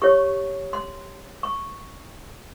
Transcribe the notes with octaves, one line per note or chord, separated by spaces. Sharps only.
G4 C#5 C#6
C6
C#6